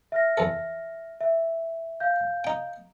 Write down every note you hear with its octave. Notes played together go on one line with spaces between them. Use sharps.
E5 F6 A#6
E2 E3 A4
E5
F5 G6
D#4 G5